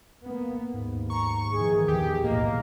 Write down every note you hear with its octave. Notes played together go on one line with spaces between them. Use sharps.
A#3 B3
D#2 G#2
A#5 C#6
A#1 D#3 E3 G#4
E2 G4
B1 A2 A#3 D#5